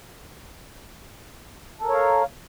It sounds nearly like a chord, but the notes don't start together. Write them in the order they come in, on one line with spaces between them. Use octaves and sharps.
A4 A#4 C#5 F5